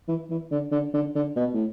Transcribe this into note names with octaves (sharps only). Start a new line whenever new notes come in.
E3
E3
D3
D3
D3
D3
B2
A2